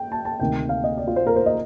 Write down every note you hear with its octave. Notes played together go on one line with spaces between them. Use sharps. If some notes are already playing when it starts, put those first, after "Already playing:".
Already playing: G5
A5
A5
D2 C3 D#3 G5
F5
D#5
D5
F4
C5
A#4
C5
D#5